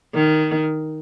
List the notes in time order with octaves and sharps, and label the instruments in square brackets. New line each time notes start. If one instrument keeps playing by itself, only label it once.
[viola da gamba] D#3